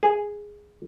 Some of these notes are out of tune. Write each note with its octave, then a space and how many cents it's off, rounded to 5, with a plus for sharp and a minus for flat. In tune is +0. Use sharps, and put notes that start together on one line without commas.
G#4 -5